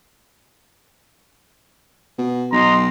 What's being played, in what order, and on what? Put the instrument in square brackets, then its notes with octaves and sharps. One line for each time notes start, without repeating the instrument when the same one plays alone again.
[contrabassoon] B2
[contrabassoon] B1 [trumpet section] D#5 A#5 C6